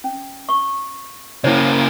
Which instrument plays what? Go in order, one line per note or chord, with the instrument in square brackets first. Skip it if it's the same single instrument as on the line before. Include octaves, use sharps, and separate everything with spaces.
[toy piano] C#4
C#6
[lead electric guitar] C#3 A#3 [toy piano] E4 C5 C#5
[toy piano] A#5